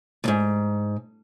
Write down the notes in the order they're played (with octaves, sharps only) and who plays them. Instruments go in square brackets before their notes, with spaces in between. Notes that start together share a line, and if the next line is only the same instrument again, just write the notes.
[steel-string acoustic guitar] D2 G#2